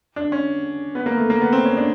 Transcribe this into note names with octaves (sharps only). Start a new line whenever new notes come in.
D4
C#4
B3
A#3
A3
A#3
B3
C4
C#4
D4